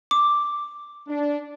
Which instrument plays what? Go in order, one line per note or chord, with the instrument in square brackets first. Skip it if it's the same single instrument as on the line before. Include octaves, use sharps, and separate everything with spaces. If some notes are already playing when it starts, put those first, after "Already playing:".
[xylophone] D6
[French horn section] D4